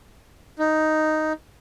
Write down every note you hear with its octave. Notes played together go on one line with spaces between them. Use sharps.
D#4